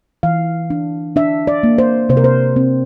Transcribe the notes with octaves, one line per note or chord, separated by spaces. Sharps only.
E3 F5
D4
D4 E5
D5
A#3
C5
C3 C5
A#4
C5
C4